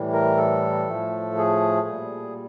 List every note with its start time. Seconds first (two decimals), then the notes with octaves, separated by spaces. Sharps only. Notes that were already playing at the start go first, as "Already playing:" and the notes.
Already playing: A2 E3 G3
0.13 A#4
0.37 A4
0.88 A2 F3 A3
1.38 G#4
1.87 A#2 G3